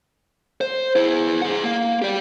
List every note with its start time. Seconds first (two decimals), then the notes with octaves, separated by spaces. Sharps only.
0.61 C5
0.96 E4 G#4
1.42 G#4 F#5
1.64 A#3
2.02 G4 D5